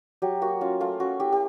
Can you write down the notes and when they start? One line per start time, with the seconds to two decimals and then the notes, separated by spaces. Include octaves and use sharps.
0.22 F#3 G4
0.42 A#3 F#4
0.61 C#4 F4
0.80 A3 F4
1.00 C#4 F#4
1.20 E4 G4
1.32 G4